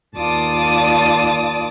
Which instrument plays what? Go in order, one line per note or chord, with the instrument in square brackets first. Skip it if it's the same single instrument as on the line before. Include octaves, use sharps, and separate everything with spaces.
[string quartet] D#2 F4 D5 A5 D6 D#6